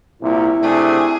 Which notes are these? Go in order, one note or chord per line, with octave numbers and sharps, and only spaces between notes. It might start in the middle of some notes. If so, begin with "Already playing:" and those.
C2 A#2 E4
C3 A3 D4 G#4